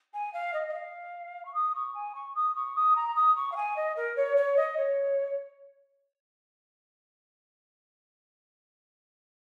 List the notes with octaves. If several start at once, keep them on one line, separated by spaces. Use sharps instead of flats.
G#5
F5
D#5
D#5
F5
C#6
D#6
C#6
G#5
C#6
D#6
C#6
D#6
A#5
D#6
C#6
F5
G#5
D#5
A#4
C#5
C#5
D#5
C#5